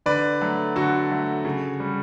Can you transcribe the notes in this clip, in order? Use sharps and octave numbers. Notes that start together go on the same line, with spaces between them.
D3 B4 D5
F#3 A3
D3 F#4 A4
F#3 A3
C#3
G3